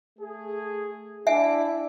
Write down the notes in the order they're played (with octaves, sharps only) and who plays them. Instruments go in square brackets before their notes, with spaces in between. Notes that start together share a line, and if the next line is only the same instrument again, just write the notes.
[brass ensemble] A3 G#4
[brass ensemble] D4 E4 [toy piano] E5 F#5 G#5